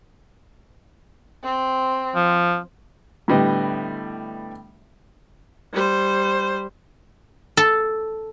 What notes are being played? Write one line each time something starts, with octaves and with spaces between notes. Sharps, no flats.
C4
F3
A2 D3 G3 B3 D#5
G3 C5
A4